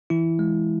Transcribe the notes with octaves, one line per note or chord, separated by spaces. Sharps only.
E3 E4
G#3